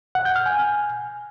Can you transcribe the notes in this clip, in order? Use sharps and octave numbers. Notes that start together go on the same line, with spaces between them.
F#5
G6
F6
G#5